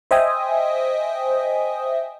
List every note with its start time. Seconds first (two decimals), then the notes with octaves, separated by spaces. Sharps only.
0.11 C5 D#5 E5 G5 G#5 D#6